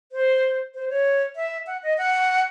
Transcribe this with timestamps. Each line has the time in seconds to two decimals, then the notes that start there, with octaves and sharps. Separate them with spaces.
0.12 C5
0.74 C5
0.90 C#5
1.36 E5
1.67 F#5
1.83 D#5
1.98 F#5